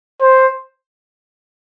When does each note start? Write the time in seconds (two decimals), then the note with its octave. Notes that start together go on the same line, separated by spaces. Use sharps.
0.21 C5